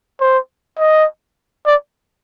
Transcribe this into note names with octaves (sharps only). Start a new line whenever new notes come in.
C5
D#5
D5